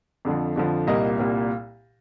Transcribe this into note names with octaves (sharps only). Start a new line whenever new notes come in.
F2 D3 F3
F2 D3 F3
C2 A#2 G3 A#3 D#5
C2 A#2 G3 A#3